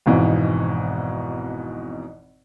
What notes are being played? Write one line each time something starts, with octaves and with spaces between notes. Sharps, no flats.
G#1 F2 G#2 B2 E3